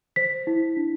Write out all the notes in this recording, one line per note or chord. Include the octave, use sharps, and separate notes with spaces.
C5 B6
E4
D4